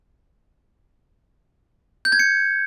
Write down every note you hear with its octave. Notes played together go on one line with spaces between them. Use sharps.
G6
G#6
C#7